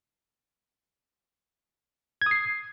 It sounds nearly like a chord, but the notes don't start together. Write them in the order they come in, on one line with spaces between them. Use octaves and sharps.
G#6 D#6 C7